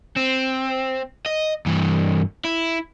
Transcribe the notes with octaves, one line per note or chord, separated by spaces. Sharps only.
C4
D#5
G2 E3
E4